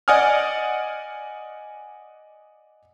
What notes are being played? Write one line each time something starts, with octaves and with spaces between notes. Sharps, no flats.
D5 D#5 F#5 G#5 D#6 F6